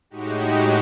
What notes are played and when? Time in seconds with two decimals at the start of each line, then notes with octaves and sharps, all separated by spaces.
0.10 A2 G#3 D#4 F#4 G4